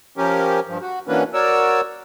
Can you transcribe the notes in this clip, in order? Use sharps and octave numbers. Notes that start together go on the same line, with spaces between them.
F3 C#4 G4 A#4
G2 F3
F#4
E3 F#3 A#3 C#4 D4 B4
F#4 A#4 C#5 D5 E6